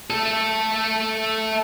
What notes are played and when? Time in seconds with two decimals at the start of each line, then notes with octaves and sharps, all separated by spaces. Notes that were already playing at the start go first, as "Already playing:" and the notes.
0.10 A3 A4